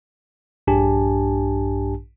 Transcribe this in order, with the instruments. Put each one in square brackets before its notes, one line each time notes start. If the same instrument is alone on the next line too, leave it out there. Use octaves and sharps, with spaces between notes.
[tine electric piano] A#1 G2 D4 G4 G#5 A5